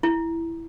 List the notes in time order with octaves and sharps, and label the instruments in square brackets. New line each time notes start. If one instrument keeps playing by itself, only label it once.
[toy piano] E4